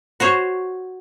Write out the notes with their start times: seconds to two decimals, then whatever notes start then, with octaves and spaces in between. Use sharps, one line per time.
0.20 F#4 C5 C#5